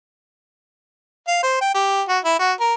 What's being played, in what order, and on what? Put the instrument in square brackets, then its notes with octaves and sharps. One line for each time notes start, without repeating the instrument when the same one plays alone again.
[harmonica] F5
C5
G5
G4
F#4
E4
F#4
A#4